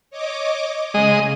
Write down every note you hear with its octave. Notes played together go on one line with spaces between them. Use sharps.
C#5 D#5 D6
C#3 G#3 D#5